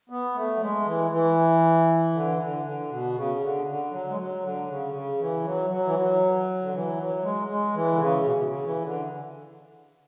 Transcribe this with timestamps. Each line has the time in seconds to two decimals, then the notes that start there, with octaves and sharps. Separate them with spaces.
0.10 B3
0.35 A3
0.56 F#3
0.60 G#3
0.86 E3
1.11 E3
2.13 D3
2.28 E3
2.39 D3
2.64 D3
2.89 B2
3.15 C#3
3.41 D3
3.66 D3
3.91 F#3
4.08 G#3
4.17 F#3
4.42 D3
4.68 C#3
4.93 C#3
5.19 E3
5.44 F#3
5.70 F#3
5.85 E3
5.95 F#3
6.61 D3
6.72 E3
6.97 F#3
7.22 G#3
7.48 G#3
7.73 E3
7.93 D3
7.99 C#3
8.24 B2
8.36 B2
8.44 C#3
8.63 E3
8.82 D3